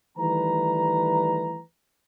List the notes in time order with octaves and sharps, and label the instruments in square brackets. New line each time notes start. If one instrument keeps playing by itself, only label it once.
[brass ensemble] D#3 E3 G3 A3 B4 A#5